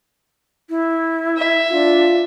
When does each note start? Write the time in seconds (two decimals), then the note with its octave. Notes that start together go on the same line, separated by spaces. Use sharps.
0.70 E4
1.37 E5
1.71 D4 F4